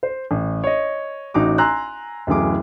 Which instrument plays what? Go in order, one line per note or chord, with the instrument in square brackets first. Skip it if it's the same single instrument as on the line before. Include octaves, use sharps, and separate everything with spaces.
[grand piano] C5
A1
C#5 D#5
A1 D#4 F#4 D6
G#5 A#5 C6 E6 F#6
D1 F#2 E3 G#4 D6